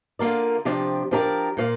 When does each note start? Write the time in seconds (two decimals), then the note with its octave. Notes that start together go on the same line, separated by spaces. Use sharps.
0.19 D3 A#3 F4 A#4 D5
0.65 C3 F3 D4 G4 D5
1.11 F3 D4 G4 A#4 D5
1.57 A#2 A#3 F4 D5